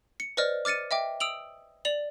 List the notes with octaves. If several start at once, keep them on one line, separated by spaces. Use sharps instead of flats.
C#7
B4 C5 D5 D#5 F6
D6 F6 A6 C#7 D#7
D#5 E5 G5 D6
D#6 E6 D7 F7 F#7
D5 F7 F#7